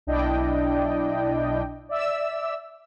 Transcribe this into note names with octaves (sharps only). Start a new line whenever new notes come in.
B1 D4 E4 D5 D#5 G5
D5 E5 E6